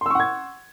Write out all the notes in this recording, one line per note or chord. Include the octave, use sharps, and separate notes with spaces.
F#5 C6 C#6 E6 G#6